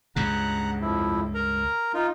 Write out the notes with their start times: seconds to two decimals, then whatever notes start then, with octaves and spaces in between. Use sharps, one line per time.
0.16 C#2 G2 C#3 F#5 A#5 F#6
0.82 F2 F3 E4
1.34 A#4 A#5
1.94 D#4 F4